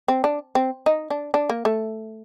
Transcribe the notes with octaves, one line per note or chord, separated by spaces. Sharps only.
C4
D4
C4
D#4
D4
D4
A#3
A3